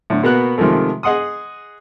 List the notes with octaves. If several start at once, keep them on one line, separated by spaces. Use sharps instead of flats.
A2 D3
B2 A#3 B3 F#4 F#6
C3 D#3 F3 G#3 A3
G#4 D#5 F#5 C6 D#6